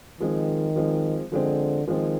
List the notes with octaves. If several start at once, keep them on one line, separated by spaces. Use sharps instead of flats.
D#3 F3 G#3 C4
F3 G#3 C4
D3 F3 G#3 C4
D#3 F3 G#3 C4